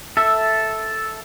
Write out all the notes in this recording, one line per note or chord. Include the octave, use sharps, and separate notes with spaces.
A4 E5